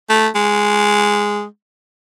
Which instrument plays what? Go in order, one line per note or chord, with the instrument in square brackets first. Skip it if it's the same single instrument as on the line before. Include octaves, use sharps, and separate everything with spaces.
[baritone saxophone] A3
G#3